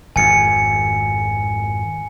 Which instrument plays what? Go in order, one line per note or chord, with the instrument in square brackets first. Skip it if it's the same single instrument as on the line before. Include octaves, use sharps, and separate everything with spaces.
[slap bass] G#1 F2 [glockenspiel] G#5 C#7